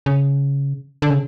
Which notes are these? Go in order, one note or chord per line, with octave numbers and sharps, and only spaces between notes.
C#3
D3
C#3